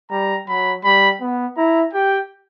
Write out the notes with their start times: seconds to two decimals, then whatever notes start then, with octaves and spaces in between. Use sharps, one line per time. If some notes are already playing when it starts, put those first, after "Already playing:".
0.11 G3 A#5
0.48 F#3 B5
0.84 G3 B5
1.21 B3
1.57 E4 A#5
1.93 G4 G5